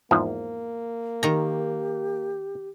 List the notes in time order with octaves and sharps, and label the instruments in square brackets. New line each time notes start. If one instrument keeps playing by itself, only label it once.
[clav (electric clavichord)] E2 G#2 F3 [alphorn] A#3
[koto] D#3 A#5 [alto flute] G4